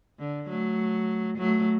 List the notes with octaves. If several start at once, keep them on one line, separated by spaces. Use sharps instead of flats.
D3
F#3 A3
F#3 A3